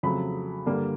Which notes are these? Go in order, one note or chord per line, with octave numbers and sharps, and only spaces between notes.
F2 C#3 F#3 A3 B5
G2 D3 G3 A#3